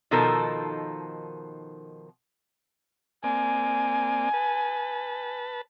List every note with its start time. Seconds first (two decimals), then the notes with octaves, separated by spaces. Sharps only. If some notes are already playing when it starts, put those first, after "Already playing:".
0.11 B2 D#3 F3 D#4 A4 A#4
3.24 A#3 C4 D5 G#5
4.34 B4 A5